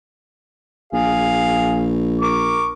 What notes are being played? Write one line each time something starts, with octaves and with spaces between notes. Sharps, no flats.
A#1 G#4 F5
A#4 C#6 D6